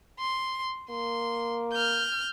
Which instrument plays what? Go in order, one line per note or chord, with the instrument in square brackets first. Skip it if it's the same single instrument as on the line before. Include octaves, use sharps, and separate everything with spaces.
[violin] C6
[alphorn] A#3 [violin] C6
[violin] F6 G6